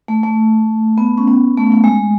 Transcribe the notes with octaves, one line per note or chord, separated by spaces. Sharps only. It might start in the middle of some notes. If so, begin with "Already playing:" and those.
A3
A3
B3
C#4
B3
A3
A3
G#3